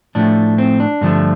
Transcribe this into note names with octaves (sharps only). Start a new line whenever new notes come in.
A2 F3 A3 D4
C4
D4
G2 D3 F3 A3